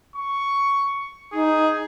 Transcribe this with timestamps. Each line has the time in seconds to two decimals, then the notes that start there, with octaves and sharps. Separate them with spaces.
0.16 C#6
1.33 D#4 G#4